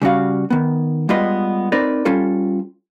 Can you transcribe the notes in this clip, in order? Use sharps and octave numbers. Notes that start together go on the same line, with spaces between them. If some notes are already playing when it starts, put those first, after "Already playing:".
C#3 G3 C#4 F#4 F5
D#3 B3
G3 G#3 B3 F4 B4 D#5
C4 D#4 A#4 B4 D5
G3 C#4 F4 A4